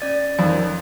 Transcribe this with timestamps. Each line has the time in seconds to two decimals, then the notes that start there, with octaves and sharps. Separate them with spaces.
0.01 C#4 D5 A6
0.39 F2 D#3